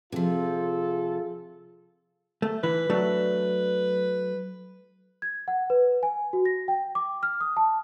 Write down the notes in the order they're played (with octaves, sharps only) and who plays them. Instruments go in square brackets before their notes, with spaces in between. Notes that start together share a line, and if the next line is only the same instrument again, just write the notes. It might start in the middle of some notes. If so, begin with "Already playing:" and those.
[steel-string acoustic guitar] C3 F3 [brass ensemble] F4 G#4 A4
[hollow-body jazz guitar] A3
[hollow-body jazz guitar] E3 [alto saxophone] B4
[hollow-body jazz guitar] F#3 A3 D4
[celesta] G#6
F#5
B4
G#5
F#4
A#6
G5
D6
F6
D#6
A5